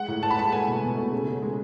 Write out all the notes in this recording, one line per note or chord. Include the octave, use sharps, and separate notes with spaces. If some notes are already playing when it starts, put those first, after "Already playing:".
Already playing: G#3 F#5
A2
A2 A5
B5
G#3 A5
A3 G#5
B2
B2
A3
C#3
C#3
G#3